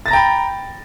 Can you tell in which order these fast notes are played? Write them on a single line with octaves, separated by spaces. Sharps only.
A6 A#6 A#5 G5 B5